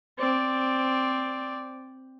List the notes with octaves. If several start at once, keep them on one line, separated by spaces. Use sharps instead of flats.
C4 D5